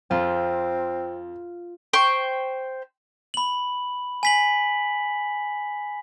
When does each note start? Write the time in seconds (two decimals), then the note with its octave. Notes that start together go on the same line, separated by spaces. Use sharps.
0.11 F2 C4 F4
1.93 C5 G5 C#6
3.34 B5 F#7
4.23 G#5 B6 F#7